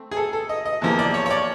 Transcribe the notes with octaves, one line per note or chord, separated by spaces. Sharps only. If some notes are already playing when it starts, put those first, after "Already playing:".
Already playing: A3 C4
G#4
A4
A4
D#5
D#5
E2 C3 F3 A#3
D5
C#5
C#5
D5